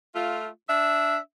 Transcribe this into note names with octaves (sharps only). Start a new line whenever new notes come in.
A3 F4
D4 E5